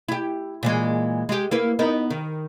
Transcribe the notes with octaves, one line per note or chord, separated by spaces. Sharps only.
E4 G4
A#2 E3 G#3
G#3 G4
A#3 E4 B4
B3 D#4 A#4
D#3